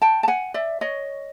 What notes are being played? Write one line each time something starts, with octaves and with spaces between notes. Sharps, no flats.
G5 A5
A5
F#5 G#5
D5 E5
C#5 D#5